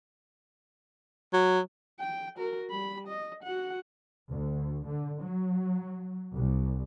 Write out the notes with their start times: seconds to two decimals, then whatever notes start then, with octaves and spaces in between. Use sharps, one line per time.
1.33 F#3
2.00 G5
2.37 F#4 A#4
2.70 G3 B5
3.08 D#5
3.43 F#4 F#5
4.29 D2
4.87 D3
5.20 F#3
6.33 C2